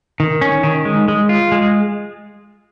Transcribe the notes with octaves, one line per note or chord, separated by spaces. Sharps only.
D#3
C#4
D#3
G#3
G#3
F4
G#3